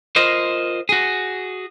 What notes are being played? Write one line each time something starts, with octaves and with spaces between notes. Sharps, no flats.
F4 A#4 C5 D#5
F#4 G#4